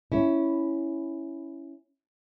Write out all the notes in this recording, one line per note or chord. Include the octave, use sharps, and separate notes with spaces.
C#4 E4